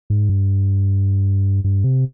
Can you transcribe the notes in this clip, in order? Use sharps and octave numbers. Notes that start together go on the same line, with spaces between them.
G#2
G2
G2
C3